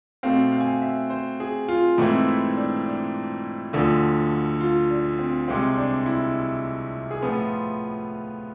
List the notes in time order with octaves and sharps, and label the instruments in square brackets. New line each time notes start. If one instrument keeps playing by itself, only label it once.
[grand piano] B2 A3 C4 F5
F5
G#5
F5
E5
C5
G#4
F4
G#2 E3 A3 C4 E4
E4
D4
D4
D2 D3 F3
F4
D4
C4
C2 C3 G#3 C4
D4
E4
G#4
A2 F3 B3 F4